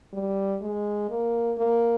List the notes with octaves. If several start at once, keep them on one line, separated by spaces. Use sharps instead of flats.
G3
G#3
A#3
A#3